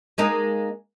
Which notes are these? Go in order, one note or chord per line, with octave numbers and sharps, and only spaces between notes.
G#3 A#3 D#4